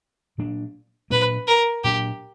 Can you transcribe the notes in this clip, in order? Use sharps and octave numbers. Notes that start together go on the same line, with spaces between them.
A#2 F#3 A#3 D4
A#2 F#3 A#3 D4 B4
A#4
A#2 F#3 A#3 D4 G4